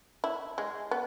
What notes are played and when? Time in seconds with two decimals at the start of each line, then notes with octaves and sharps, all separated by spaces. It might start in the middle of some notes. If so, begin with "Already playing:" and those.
0.24 E4
0.58 G#3
0.91 B3